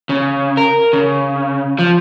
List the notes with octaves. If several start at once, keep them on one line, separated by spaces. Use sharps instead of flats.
C#3
A#4
C#3
F3